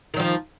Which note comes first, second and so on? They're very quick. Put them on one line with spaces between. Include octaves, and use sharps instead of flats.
D#3 F#3 F3